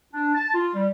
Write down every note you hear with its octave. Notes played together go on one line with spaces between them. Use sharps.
D4
A5
F4
G3